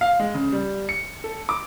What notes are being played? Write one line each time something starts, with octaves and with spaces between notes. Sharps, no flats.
F5
G#3
C#3
G3
C#7
A4
D6